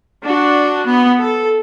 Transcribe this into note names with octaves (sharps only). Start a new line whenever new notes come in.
D4 F#4
B3
A4